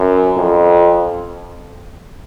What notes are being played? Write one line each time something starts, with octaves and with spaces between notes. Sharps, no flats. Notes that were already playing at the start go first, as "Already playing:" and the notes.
Already playing: F#2
F2